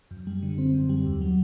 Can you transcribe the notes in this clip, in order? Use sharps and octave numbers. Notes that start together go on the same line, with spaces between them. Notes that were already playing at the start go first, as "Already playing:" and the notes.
F#2
G3
D3
C4
F#2
G3
D#2
F#3